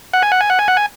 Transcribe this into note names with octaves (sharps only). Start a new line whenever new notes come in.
F#5
G#5
F#5
G#5
F#5
G#5
F#5
G#5